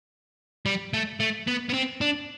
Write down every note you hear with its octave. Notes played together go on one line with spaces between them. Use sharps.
G3
A3
A3
B3
B3
C4
D4